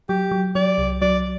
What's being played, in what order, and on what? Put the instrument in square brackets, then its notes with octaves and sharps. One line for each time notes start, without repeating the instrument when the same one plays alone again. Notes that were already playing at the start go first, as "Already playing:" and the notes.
[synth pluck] F#3 [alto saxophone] G4
[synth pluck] F#3
[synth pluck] F#3 [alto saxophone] D5
[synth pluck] C2
[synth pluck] F#3 [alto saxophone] D5